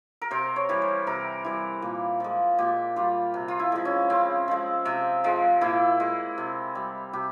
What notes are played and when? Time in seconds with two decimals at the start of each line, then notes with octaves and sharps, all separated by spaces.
0.22 A#4
0.31 C3 C5
0.56 C#5
0.69 E3 G3
0.82 C5
1.07 C3 A#4
1.45 E3 G3
1.82 A#2
2.20 F3 G#3
2.58 A#2 G4
2.96 G3 F4
3.34 C3
3.48 F4
3.59 E4
3.72 F3 G#3
3.85 C#4
4.10 C#3 C4
4.48 F3 G#3
4.85 C3
5.24 F3 G#3
5.61 A#2 E4
6.00 G#3
6.38 C3
6.75 G3
7.13 C3 G4